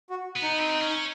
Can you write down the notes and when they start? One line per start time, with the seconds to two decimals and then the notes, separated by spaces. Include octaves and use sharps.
0.10 F#4
0.36 B3
0.43 D#4
0.59 C4
0.81 C#4